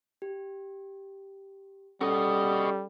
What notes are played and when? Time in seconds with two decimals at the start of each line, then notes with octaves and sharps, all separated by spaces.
0.22 G4
2.01 G3 C#4 F#4 A4 D#5